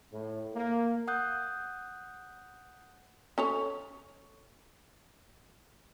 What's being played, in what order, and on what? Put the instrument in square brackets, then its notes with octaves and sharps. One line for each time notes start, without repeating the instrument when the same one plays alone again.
[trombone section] A2
A#3
[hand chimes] F#5 D#6 F#6 G6
[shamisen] C#4 A4 C#5